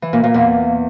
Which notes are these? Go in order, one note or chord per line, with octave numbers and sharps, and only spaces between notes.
E3
A#2
A#2
E2